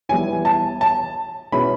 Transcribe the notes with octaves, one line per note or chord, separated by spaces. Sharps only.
E3 G3 B3 E4 G#5
A5
A5
B2 G#3 C#4 E4 B5